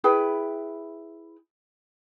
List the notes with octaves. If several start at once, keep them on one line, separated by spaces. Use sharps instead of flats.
E4 G#4 B4 G5